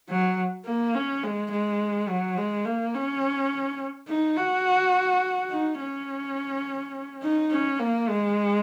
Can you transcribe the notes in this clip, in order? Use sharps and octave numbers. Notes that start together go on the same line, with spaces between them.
F#3
A#3
C#4
G#3
G#3
F#3
G#3
A#3
C#4
D#4
F#4
D#4
C#4
D#4
C#4
A#3
G#3